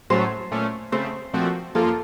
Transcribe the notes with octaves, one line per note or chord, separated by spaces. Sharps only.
A2 F#3 A3 C#4 C5
A#2 A3 C#4
C#3 A3 C4 C5
A#2 F3 A3 C4 F#4
F#2 F3 A#3 F4 A4